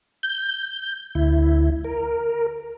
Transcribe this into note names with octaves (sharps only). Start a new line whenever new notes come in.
G6
D2 E4
A#4